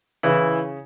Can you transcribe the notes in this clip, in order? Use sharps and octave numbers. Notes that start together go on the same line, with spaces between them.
C#3 E3 E4